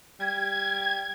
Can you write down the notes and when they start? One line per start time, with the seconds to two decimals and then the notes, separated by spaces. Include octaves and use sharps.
0.20 G3 G#6